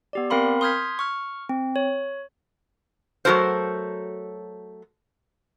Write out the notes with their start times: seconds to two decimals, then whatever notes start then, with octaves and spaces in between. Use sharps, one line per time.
0.13 B3 G4 D5
0.30 C4 A#4 F5 B5 C6
0.61 C6 D#6 F6 G6 G#6 B6
0.99 C#6 F6
1.49 C4
1.76 C#5
3.25 F#3 A3 F#4 A4 A#4 C5